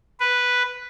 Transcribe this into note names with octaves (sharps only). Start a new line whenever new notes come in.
B4